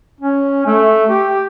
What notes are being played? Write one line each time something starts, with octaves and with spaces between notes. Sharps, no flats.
C#4
A3
G4